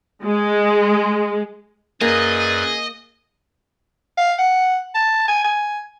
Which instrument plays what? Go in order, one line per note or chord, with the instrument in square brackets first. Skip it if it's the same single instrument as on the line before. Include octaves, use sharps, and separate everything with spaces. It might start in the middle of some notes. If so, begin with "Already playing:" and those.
[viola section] G#3
[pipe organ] F#2 B4 D5 [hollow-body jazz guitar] A#3 [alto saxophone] G#4 [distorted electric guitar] D#5
[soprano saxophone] F5
F#5
A5
G#5
G#5